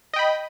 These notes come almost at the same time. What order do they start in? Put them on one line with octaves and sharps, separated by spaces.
D#5 G5 B5